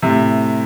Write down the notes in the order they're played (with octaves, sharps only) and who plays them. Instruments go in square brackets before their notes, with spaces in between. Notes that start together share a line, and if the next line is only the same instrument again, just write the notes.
[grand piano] A2 C3